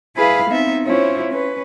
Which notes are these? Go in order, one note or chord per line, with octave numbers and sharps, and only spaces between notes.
E4 G#4 B4 F5 B5
B3 C4 D#4 E5
C#4 E4 F4 C5 C#5
C#4 B4